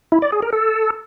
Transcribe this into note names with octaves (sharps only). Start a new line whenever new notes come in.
E4
D5
G#4
A#4
A4